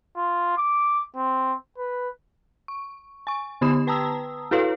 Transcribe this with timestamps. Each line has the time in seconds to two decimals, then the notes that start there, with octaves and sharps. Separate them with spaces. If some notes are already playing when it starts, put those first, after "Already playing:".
0.16 F4
0.58 D6
1.16 C4
1.78 B4
2.68 C#6
3.27 G#5 C#6
3.61 D3 B3 G4 B5 D#6 E7
3.87 B4 G5 A5 A#5 D#6 E6
4.51 E4 F#4 A4 B4 C#5 F5